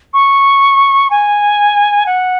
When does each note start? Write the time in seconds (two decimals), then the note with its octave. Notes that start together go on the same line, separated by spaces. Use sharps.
0.13 C#6
1.10 G#5
2.06 F#5